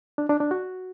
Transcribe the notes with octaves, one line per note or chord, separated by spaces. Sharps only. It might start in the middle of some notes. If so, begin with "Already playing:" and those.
D4
D4
D4
F#4